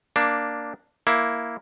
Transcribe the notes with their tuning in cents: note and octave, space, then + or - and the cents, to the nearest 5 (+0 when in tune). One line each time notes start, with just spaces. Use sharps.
A#3 +0 D4 +0
A#3 +0 E4 +0